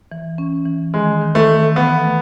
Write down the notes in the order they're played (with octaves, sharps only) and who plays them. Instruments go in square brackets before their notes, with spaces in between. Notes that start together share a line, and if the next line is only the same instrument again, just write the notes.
[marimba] E3
C#4
E3
[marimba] D#3 [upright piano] G#3
[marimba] D#3
[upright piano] A3
[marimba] D#3
[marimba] E3 [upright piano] B3
[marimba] A3